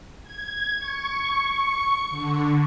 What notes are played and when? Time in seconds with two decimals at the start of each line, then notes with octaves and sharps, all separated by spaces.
0.23 G#6
0.79 C#6
2.10 D3